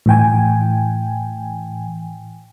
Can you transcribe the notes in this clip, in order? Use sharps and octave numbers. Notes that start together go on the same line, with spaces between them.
A2 E3 G5 G#5